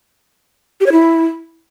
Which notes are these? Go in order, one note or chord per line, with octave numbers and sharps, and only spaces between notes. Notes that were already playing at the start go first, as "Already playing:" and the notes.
G4
C#5
E4